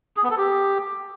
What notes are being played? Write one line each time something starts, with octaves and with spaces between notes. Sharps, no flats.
G#4
B3
A4
G4